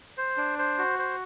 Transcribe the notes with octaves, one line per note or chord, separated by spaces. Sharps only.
C5
D4
C5
F#4
C5